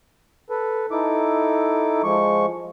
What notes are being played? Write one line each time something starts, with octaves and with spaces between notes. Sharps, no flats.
A4 B4
D#4 E4 A4 D6
F3 G#3 C#6